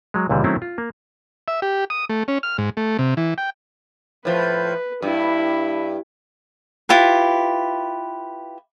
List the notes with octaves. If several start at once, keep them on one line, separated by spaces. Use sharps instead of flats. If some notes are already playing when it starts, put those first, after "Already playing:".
F#3 G#3
C#2 A#2 D3 E3 G3
D#3 F#3 A3 C4 C#4 E4
F4
A#3
E5
G4
D#6
A3
C#4
F6
G#2
A3
C3
E3
G5
A2 F3 B4
G2 E4
E4 F4 G4 B4